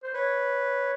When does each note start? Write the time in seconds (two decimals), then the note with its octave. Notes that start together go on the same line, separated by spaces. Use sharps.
0.03 C5
0.14 B4 C#5